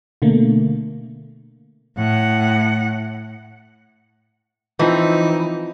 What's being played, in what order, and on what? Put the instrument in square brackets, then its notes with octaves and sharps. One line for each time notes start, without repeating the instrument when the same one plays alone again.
[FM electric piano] B2 D3 A3 A#3
[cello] A2 F#5
[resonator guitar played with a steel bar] E3 [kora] F3 C4 [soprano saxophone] D#4